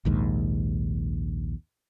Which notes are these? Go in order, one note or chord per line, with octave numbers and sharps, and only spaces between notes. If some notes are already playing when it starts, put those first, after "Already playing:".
A#1 D#2 G#2